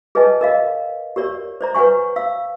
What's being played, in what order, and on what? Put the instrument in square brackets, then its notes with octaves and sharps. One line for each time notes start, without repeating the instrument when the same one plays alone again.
[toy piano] G#4 B4 C#5 D#5 G#5 A5
A#4 D#5 F5
G4 A#4 C#5 D5
C5 D5 A#5
B4 C#5 F#5 G#5 C#6
F5 E6